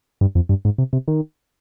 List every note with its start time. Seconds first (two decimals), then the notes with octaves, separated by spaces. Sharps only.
0.21 G2
0.35 F2
0.49 G2
0.65 G#2
0.78 C3
0.93 C3
1.08 D#3